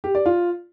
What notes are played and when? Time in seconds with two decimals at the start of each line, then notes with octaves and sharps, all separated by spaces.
0.04 G4
0.15 D5
0.26 F4